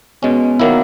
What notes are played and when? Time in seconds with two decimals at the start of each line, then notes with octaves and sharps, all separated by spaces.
0.23 B2 G#3 B3 C#4
0.60 D#3 F#3 A#3 E4